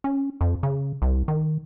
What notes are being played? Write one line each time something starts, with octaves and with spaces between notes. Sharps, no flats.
C#4
F2
C#3
C2
D#3